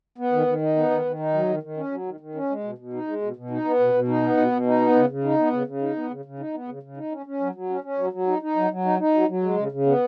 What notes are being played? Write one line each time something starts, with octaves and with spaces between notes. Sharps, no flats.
B3
D#3
D#3
D#4
B3
D#3
D#3
D#4
F#3
D#3
D#3
C#4
F#3
D#3
D#3
C#4
G#3
B2
B2
D#4
G#3
B2
B2
D#4
B3
B2
B2
D#4
B3
B2
B2
D#4
B3
C#3
C#3
D#4
B3
C#3
C#3
D#4
B3
C#3
C#3
D#4
B3
C#3
C#3
D#4
C#4
C#4
F#3
F#3
C#4
C#4
F#3
F#3
D#4
D#4
F#3
F#3
D#4
D#4
F#3
F#3
G#3
C#3
C#3
B3